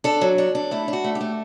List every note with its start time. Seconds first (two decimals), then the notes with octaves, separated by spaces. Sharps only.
0.04 D4 A4
0.21 F#3
0.38 D4
0.55 D4
0.71 A3 E4
0.88 D4
0.93 F#4
1.04 A3
1.15 G4
1.21 A3